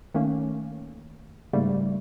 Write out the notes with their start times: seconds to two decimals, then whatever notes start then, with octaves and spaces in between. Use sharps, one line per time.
0.14 D#3 A3 A#3 C#4
1.53 G#2 C#3 G3 A3 A#3